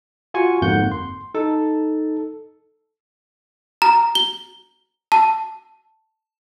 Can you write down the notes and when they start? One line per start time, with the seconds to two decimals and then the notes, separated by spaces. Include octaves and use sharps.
0.34 F4 F#4 G#5 C#6
0.62 G1 F2 G#2 A#3 F#5 G6
0.92 C6
1.34 D#4 A4 A5
3.82 A#5
4.15 G7
5.12 A5